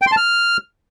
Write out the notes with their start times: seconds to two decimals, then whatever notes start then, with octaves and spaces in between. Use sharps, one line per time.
0.02 G5
0.07 C6
0.12 A5
0.17 F6